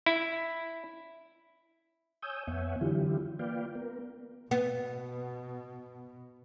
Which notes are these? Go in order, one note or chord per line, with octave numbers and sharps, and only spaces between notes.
E4
C#5 G#5 D#6 E6 G6
F2 B3 C#5 E5 F#5 G#5
D3 E3 F#3 E4 F4 G4
A#3 F4 B4 D5 F5 G5
B3 A#4
B2 B3